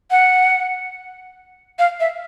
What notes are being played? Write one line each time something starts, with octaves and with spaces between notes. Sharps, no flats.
F#5
F5
E5